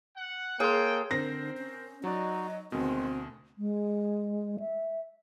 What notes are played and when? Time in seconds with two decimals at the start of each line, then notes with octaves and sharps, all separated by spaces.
0.17 F#5
0.60 A#3 G#4 A4 C#5 G5 C6
1.11 D3 C4 A#4 C5 A#6
1.57 C#4
2.04 F#3 D#4 F#4 D5 D#5
2.72 D2 B2 D#3 G#3 C4
3.58 G#3
4.60 E5